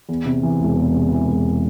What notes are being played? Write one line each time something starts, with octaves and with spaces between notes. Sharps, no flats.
E2
C3
E3
E1
E2
C3
E3
E1